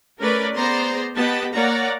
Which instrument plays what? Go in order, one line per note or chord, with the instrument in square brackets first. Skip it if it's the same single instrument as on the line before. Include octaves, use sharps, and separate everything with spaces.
[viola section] A3 C#4 A#4 B4 D5
B3 G#4 C5 D5 A#5 C6
B3 G4 D#5 G5 A5 B5
A#3 C#5 D5 F#5 A#5